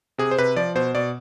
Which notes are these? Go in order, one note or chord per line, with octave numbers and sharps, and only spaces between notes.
C3 G#4
C5
C3 B4
F3 D5
B2 C5
B2 D5